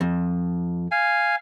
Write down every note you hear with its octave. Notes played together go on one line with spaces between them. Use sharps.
F2
F5 G#5